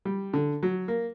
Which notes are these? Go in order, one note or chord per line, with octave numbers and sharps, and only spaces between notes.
G3
D3
F#3
A#3